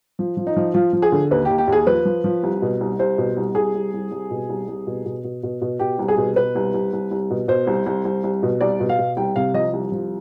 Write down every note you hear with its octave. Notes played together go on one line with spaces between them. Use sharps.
F3
F3
D#4
F3
F3 F4
F3
G#4
D3
D#2 B4
G4
D#2
G4
D#2 G#4
F3 B4
F3
F3
C2
B2
C2
C2 C5
B2
C2
C2 G#4
C2
C2
C2
B2
C2
C2
B2
B2
B2
B2
B2
B2 G4
C2
G#4
B2
B2 B4
C2
C2
C2
C2
B2
B2 C5
C2
C2
C2
C2
B2
C2 D5
B2
F5
B2
C2 G5
C3 F5
F3 D#5
C2
F3